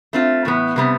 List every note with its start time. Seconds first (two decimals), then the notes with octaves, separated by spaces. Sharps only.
0.13 A3 C4 F4
0.45 A2 E3 B3
0.76 C3 G3 B3